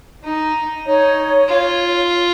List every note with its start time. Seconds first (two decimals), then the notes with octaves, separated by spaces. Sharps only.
0.24 D#4
0.85 D#4 C#5
1.48 F4